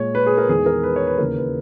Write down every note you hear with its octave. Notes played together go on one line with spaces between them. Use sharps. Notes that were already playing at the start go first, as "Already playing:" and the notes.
Already playing: A#2 G#3 C#5
B4
G#4
A#4
E2 D#3 G#3 G#4
A#4
B4
C#5
B4
D#2 C#3 E3 A#4
B4